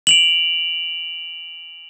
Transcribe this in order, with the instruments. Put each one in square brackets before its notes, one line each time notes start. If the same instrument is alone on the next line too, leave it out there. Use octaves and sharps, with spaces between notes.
[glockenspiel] D7 F7 F#7